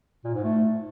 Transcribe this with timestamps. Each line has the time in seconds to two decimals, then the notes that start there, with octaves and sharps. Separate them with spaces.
0.25 A#2
0.34 G#2
0.44 A3